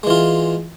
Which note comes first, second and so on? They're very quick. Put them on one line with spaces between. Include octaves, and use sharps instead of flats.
G#3 E3 F4